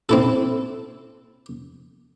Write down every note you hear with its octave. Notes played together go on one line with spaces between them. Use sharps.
C4 E4 A4